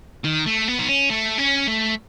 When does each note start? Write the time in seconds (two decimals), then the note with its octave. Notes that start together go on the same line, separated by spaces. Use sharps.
0.25 D#3
0.46 A3
0.68 B3
0.78 D#4
0.89 C#4
1.10 A3
1.39 C#4
1.68 A3